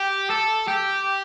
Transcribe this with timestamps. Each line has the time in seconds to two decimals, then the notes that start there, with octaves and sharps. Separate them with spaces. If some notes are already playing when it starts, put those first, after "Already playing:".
Already playing: G4
0.30 A4
0.68 G4